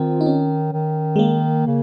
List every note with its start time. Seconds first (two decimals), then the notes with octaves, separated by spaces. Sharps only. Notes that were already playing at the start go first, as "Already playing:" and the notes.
Already playing: D#3 C4 F4
0.21 D#4
0.26 C#4
0.73 D#3
1.16 G#3
1.19 A#3
1.67 C#3